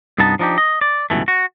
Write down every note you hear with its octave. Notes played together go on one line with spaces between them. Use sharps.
C2 G2 B3 D#4 A5
F3 D4 D#4 F#4 G4
D#5
D5
C#2 G2 B2 E3 A3
F#4